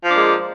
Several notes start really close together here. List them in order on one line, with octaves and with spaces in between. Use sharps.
F3 D4 A#3 G#3